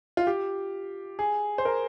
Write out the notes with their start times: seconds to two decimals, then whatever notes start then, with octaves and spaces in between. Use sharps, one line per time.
0.17 F4
0.27 G4
1.19 G#4
1.58 C5
1.65 A#4